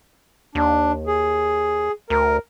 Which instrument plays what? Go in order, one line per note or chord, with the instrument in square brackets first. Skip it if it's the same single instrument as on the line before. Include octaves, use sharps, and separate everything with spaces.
[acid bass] D#2 [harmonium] D4
[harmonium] G#4
[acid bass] D2 [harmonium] A#4